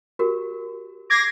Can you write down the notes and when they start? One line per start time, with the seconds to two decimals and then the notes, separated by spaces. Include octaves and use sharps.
0.19 F#4 G4 A#4
1.10 D6 G#6 A#6 C7